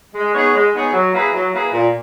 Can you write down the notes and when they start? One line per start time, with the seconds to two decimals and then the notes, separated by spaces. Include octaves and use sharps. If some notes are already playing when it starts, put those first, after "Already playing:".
0.15 G#3
0.34 B3 D#4 G#4 C#5
0.54 G#3
0.73 B3 D#4 G#4 C#5
0.93 F#3
1.13 A#3 E4 G#4 B4
1.33 F#3
1.52 A#3 E4 G#4 B4
1.73 A#2